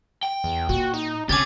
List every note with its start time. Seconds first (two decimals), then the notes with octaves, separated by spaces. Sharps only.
0.23 G5
0.44 E2
0.69 A#2 F#4
0.94 D#4
1.29 C3 C#4 G4 G#5 D6 G#6 A6